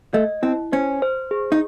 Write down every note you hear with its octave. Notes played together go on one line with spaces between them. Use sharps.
A3 D#5
C4 E4
C#4 C5
C5
G#4
D#4